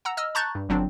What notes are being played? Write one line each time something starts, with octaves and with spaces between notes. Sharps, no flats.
F#5 A#5 E6
D#5 E6 F6
A5 A#5 C#6 F#6 G6 A6
G2
G1 F#3 C4 D4